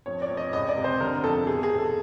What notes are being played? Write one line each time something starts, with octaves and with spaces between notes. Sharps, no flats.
F2 C#5
D5
F2
D#5
C#2 D#5
D5
C3
C5
D3 A#4
F2 A4
B2 G#4
G#4
B2
A4